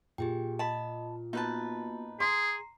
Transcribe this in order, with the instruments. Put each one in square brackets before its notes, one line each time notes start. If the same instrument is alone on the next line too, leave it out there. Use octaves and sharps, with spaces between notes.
[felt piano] A#2 [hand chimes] G4 G#4 G5
[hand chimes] D#5 [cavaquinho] A5 B5
[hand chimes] A#3 B3 F#4 [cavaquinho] D#4 B4 A5
[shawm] G#4 [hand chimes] A#5 C7 [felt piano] C6